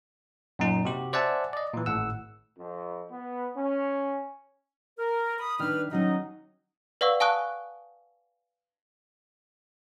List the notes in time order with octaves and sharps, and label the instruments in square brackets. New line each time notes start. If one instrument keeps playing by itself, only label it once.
[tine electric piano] F#2 A#2 D#4
C3 F#4 G4
C5 D5 E5 F#5 G#5 A5
D5 D#5
A#2 E3
G#1 A2 F#5 E6
[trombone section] F2
B3
C#4
[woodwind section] A#4
B5 D#6
[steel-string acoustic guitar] D#3 D4 [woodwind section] G3 B4 F6
[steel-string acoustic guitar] D#3 F#3 C#4 [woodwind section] D#4 D#5
[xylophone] B4 D5 F5 F#5 C#6 E6
F5 G#5 A5 C#6 D#6 F#6